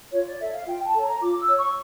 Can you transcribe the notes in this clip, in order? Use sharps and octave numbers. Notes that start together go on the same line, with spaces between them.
F4 C#5
D5
A4 C#5 E5
F5
F4 G5
A5
A4 C#5
A#5
F4 D6
E6
C#5
C#6